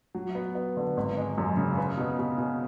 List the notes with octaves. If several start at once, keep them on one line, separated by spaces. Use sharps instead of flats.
F#3
B3
B3
D3
G#1
G#3
F#2
C#3
B4
B2
B2
B2